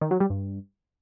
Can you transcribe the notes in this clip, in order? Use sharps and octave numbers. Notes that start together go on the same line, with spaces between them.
D#3
F#3
G3
G2